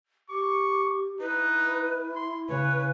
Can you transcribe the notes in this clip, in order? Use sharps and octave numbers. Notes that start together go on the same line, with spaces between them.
G4 C#6 D6
D#4 E4 B4
C6
C#3 B4 C#5